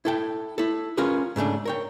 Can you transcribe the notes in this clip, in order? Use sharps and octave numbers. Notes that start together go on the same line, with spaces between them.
E4 A4 G5
E4 A4
C#4 F4 G#4 A#4 B4
G#2 C#3 A3 D4
A#4 C#5 G5